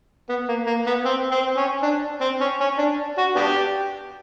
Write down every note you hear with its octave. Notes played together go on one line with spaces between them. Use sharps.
B3
A#3
A#3
B3
C4
C4
C#4
D4
C4
C#4
C#4
D4
F#4
B3 D4 G4